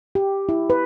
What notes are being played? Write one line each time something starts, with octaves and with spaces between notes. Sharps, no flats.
G4
E4
B4